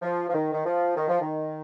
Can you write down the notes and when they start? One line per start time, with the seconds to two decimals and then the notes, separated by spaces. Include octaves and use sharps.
0.02 F3
0.29 F3
0.34 D#3
0.52 D#3
0.66 F3
0.96 D#3
1.08 F3
1.21 D#3